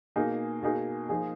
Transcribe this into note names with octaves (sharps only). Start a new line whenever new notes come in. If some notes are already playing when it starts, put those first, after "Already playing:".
B2 A#3 D#4 G#4
B2 A#3 D#4 G#4
F3 A#3 D#4 G#4